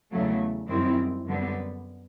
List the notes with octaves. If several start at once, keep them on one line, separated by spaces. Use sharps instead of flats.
E2 C#3 F#3 A3
F#2 D#3 G3 C4 E4
F#2 D3 G3 B3